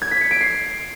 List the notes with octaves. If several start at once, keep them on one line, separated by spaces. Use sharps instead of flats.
G#6
B6
C#7
D7
C7